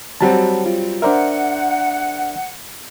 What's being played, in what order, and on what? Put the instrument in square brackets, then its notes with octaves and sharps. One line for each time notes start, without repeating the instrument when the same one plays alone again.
[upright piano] F#3 G3 C4 [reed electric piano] F#5 A5
[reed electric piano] F4
[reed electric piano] D4 D5 E5 [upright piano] A#4 C5 [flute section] F#5